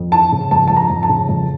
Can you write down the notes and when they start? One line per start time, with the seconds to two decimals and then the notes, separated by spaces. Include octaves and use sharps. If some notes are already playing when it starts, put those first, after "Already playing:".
Already playing: F2
0.12 E3 A5
0.32 C#3
0.51 F2 A5
0.68 F2 A5
0.76 A#5
0.90 F2
1.03 A5
1.09 C#3
1.29 F2